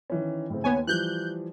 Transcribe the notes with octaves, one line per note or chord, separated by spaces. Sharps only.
D#3 E3 C#4
A2 C#3 C4
D#2 B3 C#5 G#5
E3 F3 G3 F#6 G6